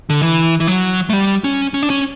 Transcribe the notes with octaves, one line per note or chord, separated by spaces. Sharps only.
D3
E3
E3
F#3
A3
G3
C#4
C#4
D4
C#4